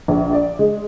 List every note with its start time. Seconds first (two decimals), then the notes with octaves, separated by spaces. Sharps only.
0.08 A#1
0.33 D5
0.59 G#3